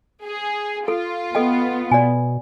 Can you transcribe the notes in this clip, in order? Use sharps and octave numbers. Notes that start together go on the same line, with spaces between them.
G#4
F4 A4
B3 A4 D#5 G5
B2 D5 G#5